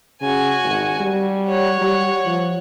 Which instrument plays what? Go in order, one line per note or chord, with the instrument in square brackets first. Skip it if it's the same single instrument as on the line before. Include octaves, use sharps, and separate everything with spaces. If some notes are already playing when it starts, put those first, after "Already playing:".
[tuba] C#3 [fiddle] F#4 G#5
[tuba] G#1
G3
[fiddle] C#5 F#5
[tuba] G3
F3